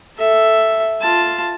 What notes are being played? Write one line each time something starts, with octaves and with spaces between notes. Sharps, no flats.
A4 E5
F4 A5